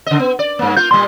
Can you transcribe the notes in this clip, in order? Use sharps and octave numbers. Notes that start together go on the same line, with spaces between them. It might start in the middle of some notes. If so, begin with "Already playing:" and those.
C#3 D#5
B3
D5
G2 A#3
A#3 F4 G6
A#2 G3 C6